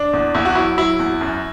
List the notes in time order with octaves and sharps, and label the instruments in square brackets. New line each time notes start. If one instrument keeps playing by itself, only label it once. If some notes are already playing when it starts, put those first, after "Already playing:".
Already playing: [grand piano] D4
E2
E2 E4
F#4
F#3 E4
F#3 E4
E2
F#2